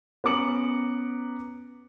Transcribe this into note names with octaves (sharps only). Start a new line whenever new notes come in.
B3 C#4 A#5 D6 C#7 F#7